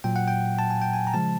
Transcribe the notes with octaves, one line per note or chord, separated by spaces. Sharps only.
A#2 F#3 G5
F#5
G5
A5
G#5
G5
G#5
A#5
C#3 F3 G#3 A5